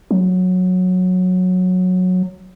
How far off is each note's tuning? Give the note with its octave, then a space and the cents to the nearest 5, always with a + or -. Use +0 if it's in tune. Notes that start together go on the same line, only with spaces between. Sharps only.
F#3 -15